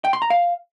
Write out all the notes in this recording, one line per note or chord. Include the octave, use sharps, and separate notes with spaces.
G5
C6
A#5
F5